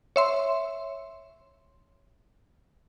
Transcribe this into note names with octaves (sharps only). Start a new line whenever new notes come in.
C#5 E5 C6